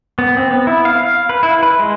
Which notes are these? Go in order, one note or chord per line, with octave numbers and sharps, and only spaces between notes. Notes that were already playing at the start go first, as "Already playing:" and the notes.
B3
C4
B3
E4
F5
F5
B4
E4
B4
G#3